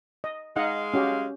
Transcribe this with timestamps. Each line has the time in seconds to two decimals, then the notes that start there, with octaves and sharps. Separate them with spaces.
0.24 D#5
0.56 G#3 D#4 D#5 F5 F#5
0.94 C#4 F#4 G4